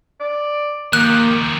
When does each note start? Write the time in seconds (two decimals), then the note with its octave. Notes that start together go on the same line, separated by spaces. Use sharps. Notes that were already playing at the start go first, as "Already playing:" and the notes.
0.20 D5
0.93 D#3 F3 A#3 G4 F#6